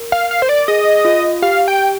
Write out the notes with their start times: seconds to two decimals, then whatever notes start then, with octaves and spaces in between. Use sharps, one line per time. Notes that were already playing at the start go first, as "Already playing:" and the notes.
Already playing: A#4
0.12 F5
0.31 F5
0.42 C5
0.49 D5
0.68 G#4 D#5
1.05 F4
1.42 G4 F5
1.68 G5